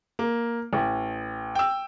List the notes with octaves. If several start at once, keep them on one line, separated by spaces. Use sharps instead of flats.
A#3
A1
G5 E6